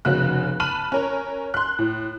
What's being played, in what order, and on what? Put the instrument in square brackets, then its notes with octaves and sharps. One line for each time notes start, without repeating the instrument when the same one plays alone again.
[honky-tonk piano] F1 C#3 A#3 F#4 F#6
A5 B5 F6 F#6 D#7 F#7
C#4 A#4 C#5
C6 F#6
A2